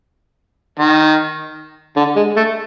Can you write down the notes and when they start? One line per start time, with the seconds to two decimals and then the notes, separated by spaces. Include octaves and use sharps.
0.79 D#3
1.96 D3
2.16 G#3
2.36 A3